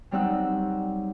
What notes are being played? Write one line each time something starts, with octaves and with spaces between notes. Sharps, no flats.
F#3 G3 C4 D#4 E6 F#6